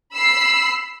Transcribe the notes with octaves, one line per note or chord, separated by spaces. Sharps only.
B5 E6 C7